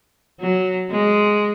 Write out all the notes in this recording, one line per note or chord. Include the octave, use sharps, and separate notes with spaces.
F#3
G#3